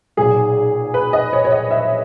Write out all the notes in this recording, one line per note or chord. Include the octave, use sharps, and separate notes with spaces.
B1 A#2 F#3 G#4
B4
D#5
C#5
C#5
D#5
E5